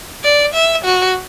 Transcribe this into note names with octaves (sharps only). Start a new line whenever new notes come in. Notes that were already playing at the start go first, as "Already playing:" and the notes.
D5
E5
F#4